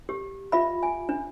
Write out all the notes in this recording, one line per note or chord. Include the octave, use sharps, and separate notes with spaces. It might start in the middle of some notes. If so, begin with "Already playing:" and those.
G4
F4 E5 B5
G#5
D4